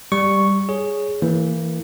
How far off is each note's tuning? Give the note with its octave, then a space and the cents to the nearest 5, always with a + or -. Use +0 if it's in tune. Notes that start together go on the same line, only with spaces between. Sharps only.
G3 +0 C#6 +0
G#4 +0 C#5 +0
E3 +0 A#3 -25